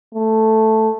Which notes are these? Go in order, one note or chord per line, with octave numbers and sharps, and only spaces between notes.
A3